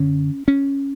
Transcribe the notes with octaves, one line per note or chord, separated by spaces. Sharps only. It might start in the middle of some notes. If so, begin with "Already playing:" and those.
Already playing: F#2 D3 C#4
C#4